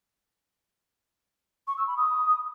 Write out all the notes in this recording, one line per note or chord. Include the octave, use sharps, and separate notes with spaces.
C#6
E6
B5
D#6